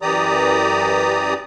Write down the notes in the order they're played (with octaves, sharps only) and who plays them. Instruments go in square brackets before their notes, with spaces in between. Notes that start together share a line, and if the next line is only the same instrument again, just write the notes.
[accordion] F#2 E3 G4 D5 A#5 D#6